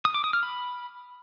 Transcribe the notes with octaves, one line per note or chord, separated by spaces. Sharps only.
D#6
D6
D#6
F6
B5